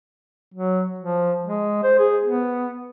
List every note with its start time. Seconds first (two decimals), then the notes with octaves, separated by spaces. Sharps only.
0.54 F#3
0.99 F3
1.43 G#3
1.83 C5
1.98 G#4
2.24 B3